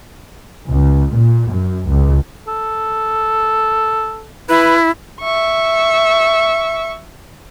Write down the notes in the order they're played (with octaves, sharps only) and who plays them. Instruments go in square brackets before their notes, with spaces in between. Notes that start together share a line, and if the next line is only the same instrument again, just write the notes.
[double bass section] C#2
A#2
F#2
C#2
[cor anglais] A4
[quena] E4 [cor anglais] B4
[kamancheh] E5 C#6